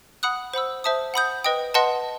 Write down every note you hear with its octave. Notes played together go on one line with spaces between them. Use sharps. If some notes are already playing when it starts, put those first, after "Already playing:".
F#5 B5 D#6 F#6
C5 F#5 B5 E6
C5 E5 A5 D#6
F#5 B5 D#6 G6
B4 D#5 G5 D#6
B4 D#5 F#5 A5 C6